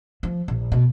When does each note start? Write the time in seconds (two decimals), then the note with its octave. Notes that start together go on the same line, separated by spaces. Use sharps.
0.23 F3
0.48 A#1
0.72 B2